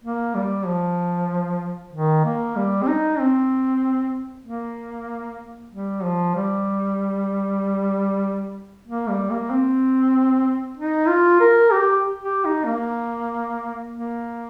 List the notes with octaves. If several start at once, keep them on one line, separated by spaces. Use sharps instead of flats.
A#3
G3
F3
D#3
A#3
G3
C4
D#4
C4
A#3
G3
F3
G3
A#3
G3
A#3
C4
D#4
F4
A#4
G4
G4
D#4
A#3
A#3